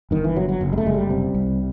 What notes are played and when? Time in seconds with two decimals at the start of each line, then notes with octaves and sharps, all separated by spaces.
0.11 G1 D#3
0.24 E3
0.36 G1 F#3
0.49 F#3
0.61 F#1
0.73 G#3
0.78 A3
0.86 F#1 G#3
0.94 G3
1.10 C3
1.34 C2